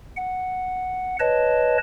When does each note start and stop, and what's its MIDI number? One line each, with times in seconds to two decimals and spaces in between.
0.16 1.16 78
1.20 1.78 71
1.20 1.78 73
1.20 1.78 75
1.20 1.78 81